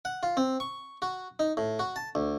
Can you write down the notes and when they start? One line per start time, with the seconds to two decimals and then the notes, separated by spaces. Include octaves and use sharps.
0.05 F#5
0.23 F4
0.37 C4
0.60 C#6
1.02 F#4
1.39 D#4
1.57 A2
1.79 F#4
1.96 A5
2.15 D2